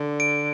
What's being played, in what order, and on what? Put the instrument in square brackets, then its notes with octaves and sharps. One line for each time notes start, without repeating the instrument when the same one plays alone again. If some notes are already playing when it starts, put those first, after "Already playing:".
Already playing: [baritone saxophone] D3
[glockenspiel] D7